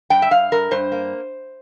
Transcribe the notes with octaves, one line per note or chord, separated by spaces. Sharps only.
G2 G5
E5
G2 F5
G2 A#4
G2 C5
A#3